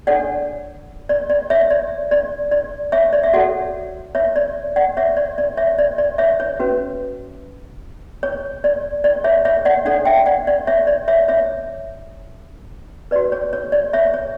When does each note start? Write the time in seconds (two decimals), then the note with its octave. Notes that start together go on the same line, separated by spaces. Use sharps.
0.07 D4 A4 C#5 D5 F#5
1.09 D5
1.30 D5
1.50 C#5 E5
1.70 D5
2.11 D5
2.51 D5
2.92 C#5 E5
3.13 D5
3.23 E5
3.33 F#4 A4 C#5 D5 F#5
4.15 C#5 E5
4.36 D5
4.76 D5 F#5
4.97 C#5 E5
5.17 D5
5.38 D5
5.57 C#5 E5
5.78 D5
5.98 D5
6.18 C#5 E5
6.40 C#5
6.59 C#4 F#4 B4
8.23 C#5
8.64 D5
9.04 D5
9.24 C#5 E5
9.45 C#5 E5
9.65 D5 F#5
9.85 D4 A4 C#5 D5 F#5
10.05 E5 G5
10.26 D5 F#5
10.47 D5
10.67 C#5 E5
10.87 D5
11.08 C#5 E5
11.28 C#5 E5
13.11 B4 D5
13.16 F#4
13.32 C#5
13.53 C#5
13.72 D5
13.93 C#5 E5
14.14 C#5